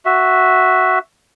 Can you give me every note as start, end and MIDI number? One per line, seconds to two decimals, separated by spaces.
0.05 0.99 66
0.05 0.99 76